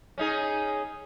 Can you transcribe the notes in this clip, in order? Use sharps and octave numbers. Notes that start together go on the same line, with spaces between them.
C#4 D#4 G#4